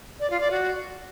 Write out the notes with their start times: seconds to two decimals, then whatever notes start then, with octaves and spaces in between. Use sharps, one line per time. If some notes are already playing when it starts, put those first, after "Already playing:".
0.20 D5
0.30 F4
0.40 D5
0.51 F#4